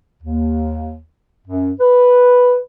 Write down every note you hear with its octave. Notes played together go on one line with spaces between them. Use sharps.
D#2
F#2
B4